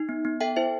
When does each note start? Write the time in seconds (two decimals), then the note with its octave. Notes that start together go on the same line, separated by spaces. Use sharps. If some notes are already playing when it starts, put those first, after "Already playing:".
Already playing: D#4
0.09 B3
0.25 B3
0.41 A4 E5 G5
0.56 E4 C5 E5